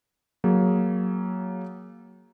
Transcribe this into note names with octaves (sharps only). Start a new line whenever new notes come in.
F#3 A#3 G#4